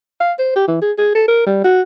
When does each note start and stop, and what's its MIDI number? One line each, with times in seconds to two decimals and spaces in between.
0.20 0.33 77
0.39 0.55 72
0.56 0.64 67
0.68 0.80 52
0.82 0.92 68
0.98 1.12 68
1.15 1.26 69
1.28 1.43 70
1.46 1.61 55
1.64 1.82 66